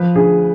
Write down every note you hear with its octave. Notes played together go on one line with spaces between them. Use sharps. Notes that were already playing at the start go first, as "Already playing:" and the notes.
Already playing: F3 B4
D2 G#4